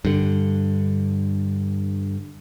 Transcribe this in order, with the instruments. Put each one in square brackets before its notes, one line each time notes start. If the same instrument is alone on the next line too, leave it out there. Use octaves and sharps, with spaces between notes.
[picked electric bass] G2 D3